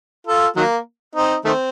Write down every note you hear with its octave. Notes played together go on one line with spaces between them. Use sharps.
F4 A4
D#3 F#3 A#3
C4 D#4
D#3 A3 C4